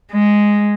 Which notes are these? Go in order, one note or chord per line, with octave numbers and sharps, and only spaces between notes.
G#3